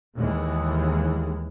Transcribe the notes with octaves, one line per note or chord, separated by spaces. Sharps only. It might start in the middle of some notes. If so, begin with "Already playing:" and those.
D#2 D#3 E3 G#3